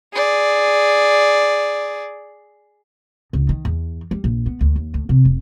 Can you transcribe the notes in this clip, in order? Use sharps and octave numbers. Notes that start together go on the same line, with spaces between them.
G#4 D5
C#2
D#3
E2
G3
A#1
B3
D2
D#2
D2
C3
F1